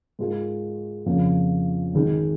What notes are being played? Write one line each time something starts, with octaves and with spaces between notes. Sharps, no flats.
G#2 G#3 F4 A#4
F2 C#3 F3 A#3
G#1 G#2 D#3 G#3